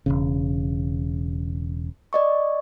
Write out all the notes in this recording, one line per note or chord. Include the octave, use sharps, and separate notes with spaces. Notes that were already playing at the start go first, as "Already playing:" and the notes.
E1 A#1 C#3
D5 D#5 C#6